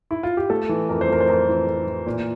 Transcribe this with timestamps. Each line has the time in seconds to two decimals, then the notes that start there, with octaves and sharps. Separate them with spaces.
0.11 E4
0.23 F4
0.37 G4
0.50 A3 A4
0.69 E3
0.89 F2 A#4
1.01 C5
1.08 A3 A#4
1.20 C5
1.28 F2 A#4
1.48 E3
1.67 F2
1.87 E3
2.06 A#2